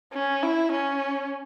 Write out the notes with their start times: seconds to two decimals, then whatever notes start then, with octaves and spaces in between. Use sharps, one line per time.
0.14 C#4
0.43 E4
0.72 C#4